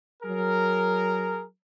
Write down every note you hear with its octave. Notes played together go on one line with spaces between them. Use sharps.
F#3 G#4 A#4